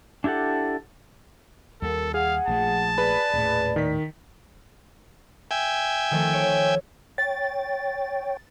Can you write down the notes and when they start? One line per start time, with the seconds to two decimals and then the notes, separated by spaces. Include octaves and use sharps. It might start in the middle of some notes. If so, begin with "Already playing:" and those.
0.24 D4 E4 G4 A4 F#5
1.82 D#2 G3 A4 A#4
2.14 G#4 F5 F#5
2.48 A#1 F3 A3 A5
2.98 G#4 B4 D5 B5
3.34 D#1 A2
3.76 D#3 B6
5.51 E5 G5 G#5
6.11 D#3 F3 A3
6.33 C#5 D7
7.18 C#5 G5 A6